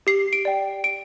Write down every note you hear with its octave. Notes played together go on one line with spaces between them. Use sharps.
G4 C7
D7
D5 G5
G4 D7